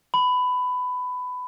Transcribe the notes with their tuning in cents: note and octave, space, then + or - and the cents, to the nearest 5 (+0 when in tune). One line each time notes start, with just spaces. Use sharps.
B5 +20